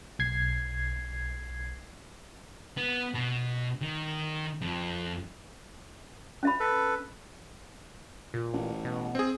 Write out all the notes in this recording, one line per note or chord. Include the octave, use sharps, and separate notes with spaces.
B1 G#6 C7
B3
B2
D#3
F2
C#4 E5 B5
A4 B4
A#2
A1
B2
C4 G#4